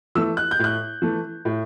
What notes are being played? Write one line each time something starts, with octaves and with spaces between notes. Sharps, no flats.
E3 A3 E6
F#6
G6
A2 F#6
E3 A3
A2